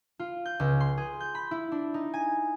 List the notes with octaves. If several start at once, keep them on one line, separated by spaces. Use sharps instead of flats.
F4
G6
C#2
C6
G#4
G6
B5
E4
D4
D#4
G#5